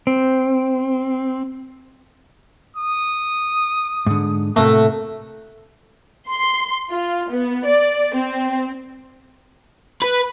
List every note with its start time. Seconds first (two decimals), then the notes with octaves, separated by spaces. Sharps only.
0.07 C4
2.76 D#6
4.07 G#2 D3
4.56 A2 C3 A3 A#3 F#4
6.29 C6
6.91 F4
7.30 B3
7.67 D5
8.15 C4
10.02 B4